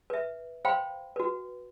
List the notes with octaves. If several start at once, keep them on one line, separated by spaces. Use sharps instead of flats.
B4 E5
C5 F5 G5 B5 C6
F#4 B4